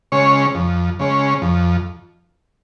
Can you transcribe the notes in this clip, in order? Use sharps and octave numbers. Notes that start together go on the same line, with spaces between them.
C#3 G#3 C#4 C#5
F2
C#3 G#3 C#4
F2